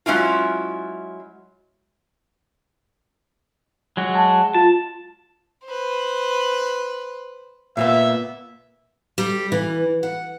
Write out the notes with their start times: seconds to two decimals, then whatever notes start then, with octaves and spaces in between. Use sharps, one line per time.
0.06 F#3 G#3 C#4 E4 F4
3.97 F#3 G#3 F#4
4.15 A5
4.54 F4 A5
5.65 B4 C5
7.77 A#2 A#3 B3 E5
9.18 G3
9.52 E3
10.03 F#5